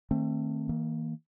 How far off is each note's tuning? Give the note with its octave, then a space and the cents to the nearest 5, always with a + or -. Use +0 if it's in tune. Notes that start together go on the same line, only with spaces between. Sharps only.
D#3 +0 A3 +30 C4 +25
E3 -45 A#3 +0